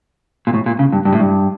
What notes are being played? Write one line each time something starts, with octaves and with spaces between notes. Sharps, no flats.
A#2
A2
A#2
C#3
G2
G2
A2
G2